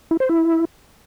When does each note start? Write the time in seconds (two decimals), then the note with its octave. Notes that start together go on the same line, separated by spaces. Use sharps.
0.11 E4
0.20 C5
0.29 E4